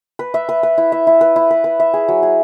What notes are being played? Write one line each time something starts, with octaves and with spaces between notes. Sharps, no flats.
B4
E5
B4
B4
E4
E5
E4
B4
E4
B4
B4
E5
G#4
F#3
G#4